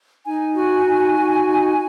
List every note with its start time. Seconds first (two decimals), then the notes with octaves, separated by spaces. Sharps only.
0.24 D#4 G#5
0.55 F#4
0.86 D#4
1.16 F#4
1.47 D#4